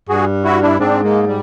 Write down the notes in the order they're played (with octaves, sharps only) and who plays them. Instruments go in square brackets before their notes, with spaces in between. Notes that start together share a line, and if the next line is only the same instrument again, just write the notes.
[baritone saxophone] G2 [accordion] F#4 G#4
[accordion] E4 F#4
D4 E4
[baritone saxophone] G#2 [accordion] C4 D4
[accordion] G#3 A#3
G3